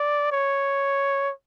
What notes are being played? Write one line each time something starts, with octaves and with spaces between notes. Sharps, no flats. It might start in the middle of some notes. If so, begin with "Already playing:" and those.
Already playing: D5
C#5